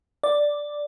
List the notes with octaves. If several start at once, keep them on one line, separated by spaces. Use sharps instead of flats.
D5